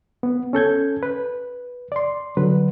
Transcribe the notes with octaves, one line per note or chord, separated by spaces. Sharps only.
B3
C#4 A4 G6 G#6
B4
D5 C6
D3 F#3 B4